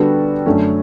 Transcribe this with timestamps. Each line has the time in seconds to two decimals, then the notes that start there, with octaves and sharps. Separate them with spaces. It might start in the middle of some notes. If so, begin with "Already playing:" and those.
Already playing: D3 G3 B3 F#4 A4
0.46 F#2 D3 A3 C#4